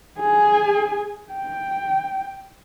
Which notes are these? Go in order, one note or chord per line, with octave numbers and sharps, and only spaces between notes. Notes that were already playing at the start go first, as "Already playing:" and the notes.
G#4 G#5
G5